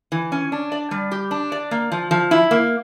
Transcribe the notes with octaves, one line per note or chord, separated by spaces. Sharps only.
E3
C#4
D4
D5
G3
G4
D4
D5
A#3
F3
F3
E4
A#3